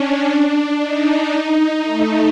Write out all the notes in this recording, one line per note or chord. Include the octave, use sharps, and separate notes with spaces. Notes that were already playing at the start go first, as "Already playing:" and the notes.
Already playing: C#4 D4
D#4
A3